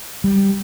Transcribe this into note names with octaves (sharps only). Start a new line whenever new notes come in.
G3